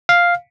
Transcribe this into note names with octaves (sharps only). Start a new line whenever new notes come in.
F5